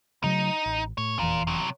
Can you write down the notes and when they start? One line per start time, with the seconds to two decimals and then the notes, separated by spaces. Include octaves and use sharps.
0.24 C#3 F#3 A3 D#4
0.66 A1
0.98 A2 C#5
1.19 F1 E2 E3 F4 A#4
1.47 C3 F#3